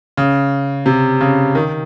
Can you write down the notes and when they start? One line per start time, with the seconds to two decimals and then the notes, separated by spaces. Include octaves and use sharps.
0.17 C#3
0.86 C3
1.21 C#3
1.55 D#3